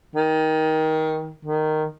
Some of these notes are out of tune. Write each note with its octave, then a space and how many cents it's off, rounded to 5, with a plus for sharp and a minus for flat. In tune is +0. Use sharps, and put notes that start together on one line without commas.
D#3 +20
D#3 -10